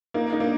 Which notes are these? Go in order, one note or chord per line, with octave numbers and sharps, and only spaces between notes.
A#3 D#4
D#4
A#3 D4